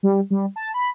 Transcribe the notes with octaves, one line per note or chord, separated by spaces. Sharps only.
G3
G3
A5
B5